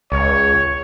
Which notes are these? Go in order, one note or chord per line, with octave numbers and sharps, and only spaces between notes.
C#2 C#5